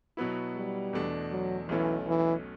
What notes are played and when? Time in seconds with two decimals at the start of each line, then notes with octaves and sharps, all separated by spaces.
0.17 B2 F#3 B3 E4
0.56 G3
0.93 E2 B2 A3 D4
1.32 F#3
1.69 B1 B2 E3 A3 C#4
2.07 E3